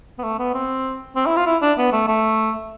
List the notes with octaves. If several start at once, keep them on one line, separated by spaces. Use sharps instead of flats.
B3
A3
B3
C4
C4
E4
F4
E4
D4
B3
A3
A3